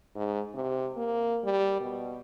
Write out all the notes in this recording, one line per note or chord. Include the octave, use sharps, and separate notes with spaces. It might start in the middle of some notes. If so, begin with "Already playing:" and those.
G#2
C3
A#3
G3
B2